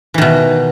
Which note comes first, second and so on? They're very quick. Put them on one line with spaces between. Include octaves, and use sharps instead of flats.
E3 D#3 B2